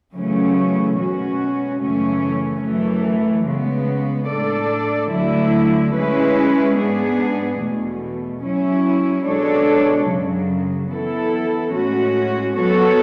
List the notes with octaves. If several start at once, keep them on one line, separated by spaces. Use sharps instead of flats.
F#2 C#3 E3 A3 C#4
B2 G#3 C#4 F#4
F#2 C#3 E3 A3 C#4
F#2 E3 A3
C#3 G#3 B3
A2 G#3 D4 A4 D5
D2 D3 F#3 A3 E4
G#3 C#4 E4 B4
G#2 G#3 B3 D4 G#4
E2 B2 A3
F#3 C#4 E4
B2 G#3 D4 A4 C#5
F#2 C#3 F#3
E3 B3 E4 A4
A2 G#3 C#4 F#4
F#3 B3 F#4 A4 C#5